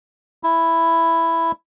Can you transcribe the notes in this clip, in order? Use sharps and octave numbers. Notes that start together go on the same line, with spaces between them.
E4